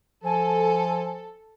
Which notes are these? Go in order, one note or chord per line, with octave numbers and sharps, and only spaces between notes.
F3 A4 G#5